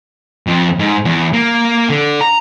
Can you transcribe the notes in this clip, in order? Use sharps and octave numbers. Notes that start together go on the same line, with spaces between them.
F2
G#2
E2
A#3
D3
A#5